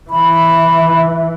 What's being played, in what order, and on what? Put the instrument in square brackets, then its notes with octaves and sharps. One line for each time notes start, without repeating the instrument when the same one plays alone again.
[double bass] E3 [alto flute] B5